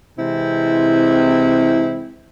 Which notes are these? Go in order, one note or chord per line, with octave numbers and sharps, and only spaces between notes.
C3 E3 G#3 C4 E4